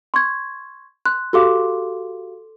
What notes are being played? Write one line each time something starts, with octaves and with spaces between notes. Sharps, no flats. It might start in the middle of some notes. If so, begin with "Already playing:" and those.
C6 C#6 G#6
C6 F#6
F#4 G4 A4 F5 C6 D6